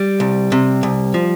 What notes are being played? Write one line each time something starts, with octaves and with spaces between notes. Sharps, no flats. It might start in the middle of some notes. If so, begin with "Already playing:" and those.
Already playing: G3
C2
C3
C2
F3